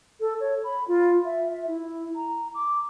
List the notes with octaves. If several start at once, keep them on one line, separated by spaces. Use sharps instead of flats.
A4
C#5
B5
F4
E5
E5
E4
A#5
D6